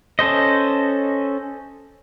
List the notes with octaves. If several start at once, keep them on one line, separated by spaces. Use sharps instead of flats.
C#4 A4 C5 D#5